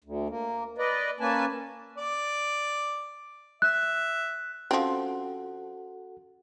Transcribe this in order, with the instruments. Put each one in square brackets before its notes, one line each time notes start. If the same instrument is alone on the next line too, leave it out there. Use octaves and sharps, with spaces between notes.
[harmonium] D2
A#3
B4 D5 D#5
A#3 C#4 B4 G#5 A5
[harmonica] D5
[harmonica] E5 [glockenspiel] F#6
[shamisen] F3 C4 [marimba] C#4 F5 [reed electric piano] F#4 A4 F#5